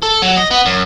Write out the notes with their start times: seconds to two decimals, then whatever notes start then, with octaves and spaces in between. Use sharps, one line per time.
0.03 A4
0.22 F#3
0.37 D#5
0.51 B3
0.66 F#2